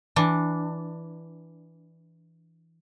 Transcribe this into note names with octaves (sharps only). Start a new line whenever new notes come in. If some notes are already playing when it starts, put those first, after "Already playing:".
E3 D4